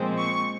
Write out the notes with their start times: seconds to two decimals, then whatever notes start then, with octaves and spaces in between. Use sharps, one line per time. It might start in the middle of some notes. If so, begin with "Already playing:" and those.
Already playing: A#2 F3 G#3 C4
0.18 C#6